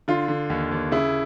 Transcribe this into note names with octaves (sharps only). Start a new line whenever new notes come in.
D3 F4
D3
D#2
D#2
C#3 E4